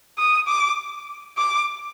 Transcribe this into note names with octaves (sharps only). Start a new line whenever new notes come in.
D#6
D6
D6